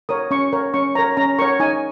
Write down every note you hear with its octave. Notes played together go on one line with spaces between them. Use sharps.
A#4 C#5 D#6
C#4 C#6
A#4 C#5
C#4 C#6
A#4 C#5 A#5
C#4 A#5
A#4 C#5 C#6
D#4 G#5